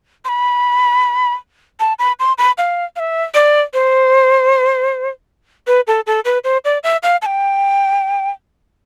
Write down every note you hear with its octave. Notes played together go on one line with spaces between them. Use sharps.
C6
B5
A5
B5
C6
B5
F5
F5
E5
D5
C5
B4
A4
A4
B4
C5
D5
E5
F5
A5
G5